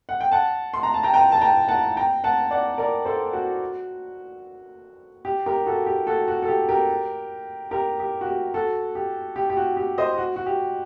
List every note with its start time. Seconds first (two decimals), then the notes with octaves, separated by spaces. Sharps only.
0.09 F#5
0.21 G5
0.32 F#5 A5
0.74 C6
0.83 A#5
0.94 A5
1.03 G5 A#5
1.14 G5 A#5
1.32 A5
1.41 G5 A#5
1.68 F#5 A5
1.97 G5 A#5
2.24 F#5 A5
2.51 D5 F#5
2.78 A#4 D5
3.05 A4 C5
3.33 F#4
5.25 G4
5.46 G4 A#4
5.66 F#4 A4
5.86 G4
6.07 F#4 A4
6.28 F#4
6.42 A4
6.48 G4
6.69 G4 A#4
7.71 G4 A#4
8.00 G4
8.21 F#4
8.26 G4
8.54 F#4 A4
8.95 G4
9.36 G4
9.50 G4
9.57 F#4
9.77 G4
9.98 C5 D#5
10.18 F#4
10.36 F#4
10.46 G4